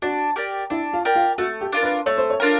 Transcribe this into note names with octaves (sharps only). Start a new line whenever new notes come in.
D4 F#4
G4 A#4 D5
D4 E4
F4
G4 A#4 D5
F4
A3 F#4
G4
D4 F4 A#4
B4
A3 C#5
C5
C#5
D4 F4 A#4